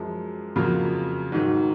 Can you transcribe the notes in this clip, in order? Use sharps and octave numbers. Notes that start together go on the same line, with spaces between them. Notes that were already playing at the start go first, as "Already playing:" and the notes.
Already playing: F#2 F3 G#3
F2 C#3 F#3 A#3 F4
G#2 D#3 F#3